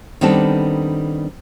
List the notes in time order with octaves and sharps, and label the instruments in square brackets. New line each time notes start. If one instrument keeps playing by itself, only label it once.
[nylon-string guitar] D#3 G3 B3 C4 D4 A4